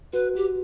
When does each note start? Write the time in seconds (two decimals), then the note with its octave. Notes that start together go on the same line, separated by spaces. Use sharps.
0.13 F#4 B4
0.35 F#4 G4